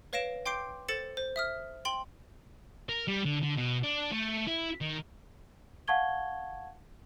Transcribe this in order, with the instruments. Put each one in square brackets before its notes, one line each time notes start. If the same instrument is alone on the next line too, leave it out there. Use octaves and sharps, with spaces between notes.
[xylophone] B4 C#5 F5 A#6 D7 E7
G5 C6 D6 G6 C7 D7
A4 C5 A6 C#7 E7
C5
E5 D#6 F6
G5 C6 F#7
[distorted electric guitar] A#4
G3
D3
D3
B2
D4
A3
E4
D#3
[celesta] F5 F#5 A5 C#6 G#6 G7